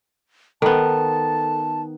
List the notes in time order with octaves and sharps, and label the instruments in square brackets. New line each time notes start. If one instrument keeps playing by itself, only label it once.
[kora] D#3 B3 [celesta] A4 [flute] A5